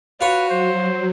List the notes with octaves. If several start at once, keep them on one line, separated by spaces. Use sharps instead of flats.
F4 F#4 B4 C#5
F#3 C5